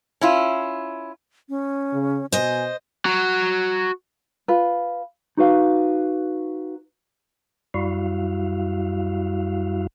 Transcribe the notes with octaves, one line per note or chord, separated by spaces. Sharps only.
C#4 E4 F4
C#4
C#3
B2 C5 D#5 G#5
F#4 A#5
F4 B4
D#4 F#4 B4 F5
F#2 G3 E4 F#4 F5